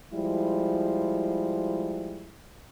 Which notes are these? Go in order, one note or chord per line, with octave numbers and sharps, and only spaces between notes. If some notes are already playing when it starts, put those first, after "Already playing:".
F3 G3 G#3 E4